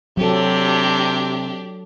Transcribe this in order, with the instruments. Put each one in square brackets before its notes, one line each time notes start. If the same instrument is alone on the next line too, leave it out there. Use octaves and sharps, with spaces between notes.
[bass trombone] C3 [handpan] F#3 A4 [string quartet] D4 G4